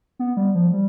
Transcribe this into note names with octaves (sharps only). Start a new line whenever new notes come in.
B3
G3
F3
G3